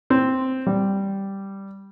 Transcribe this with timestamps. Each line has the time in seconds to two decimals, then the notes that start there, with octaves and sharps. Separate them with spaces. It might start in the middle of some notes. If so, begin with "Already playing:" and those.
0.10 C4
0.67 G3